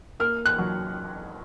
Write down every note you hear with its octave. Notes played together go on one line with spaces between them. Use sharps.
A#3 F6
F#6
F#3